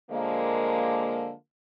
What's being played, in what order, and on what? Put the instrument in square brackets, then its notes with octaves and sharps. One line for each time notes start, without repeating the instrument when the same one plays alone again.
[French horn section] D3 F3 G#3 A#3